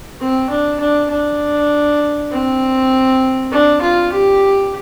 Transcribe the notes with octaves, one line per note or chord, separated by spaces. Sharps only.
C4
D4
D4
D4
C4
D4
F4
G4